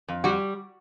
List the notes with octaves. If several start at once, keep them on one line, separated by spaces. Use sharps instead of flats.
F2
G3 F#4